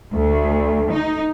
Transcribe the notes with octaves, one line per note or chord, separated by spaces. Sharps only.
D2
D#4